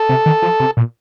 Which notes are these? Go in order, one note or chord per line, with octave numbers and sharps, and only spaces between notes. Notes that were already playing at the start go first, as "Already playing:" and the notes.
Already playing: A4
C3
D#3
F3
C3
A#2